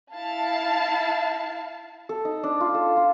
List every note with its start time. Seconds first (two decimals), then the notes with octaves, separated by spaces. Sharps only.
0.14 E4 F5 A5
2.09 A4
2.25 D#4
2.43 D4
2.61 F4
2.74 A4
2.97 F4